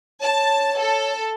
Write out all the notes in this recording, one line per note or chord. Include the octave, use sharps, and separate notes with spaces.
C#5 A5
A4